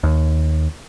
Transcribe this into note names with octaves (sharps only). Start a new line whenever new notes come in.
D#2